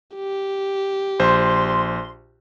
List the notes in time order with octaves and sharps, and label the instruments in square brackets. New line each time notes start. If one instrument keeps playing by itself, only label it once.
[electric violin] G4
[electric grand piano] A#1 C5 [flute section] C6